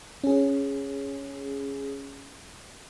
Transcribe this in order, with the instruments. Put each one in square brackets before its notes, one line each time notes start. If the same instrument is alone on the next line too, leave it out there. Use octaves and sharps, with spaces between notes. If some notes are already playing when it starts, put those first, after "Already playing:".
[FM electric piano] C#4 G#4